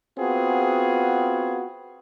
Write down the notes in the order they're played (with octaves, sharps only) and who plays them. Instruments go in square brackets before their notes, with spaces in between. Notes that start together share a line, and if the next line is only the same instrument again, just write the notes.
[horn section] B3 C4 F4 F#4 G#4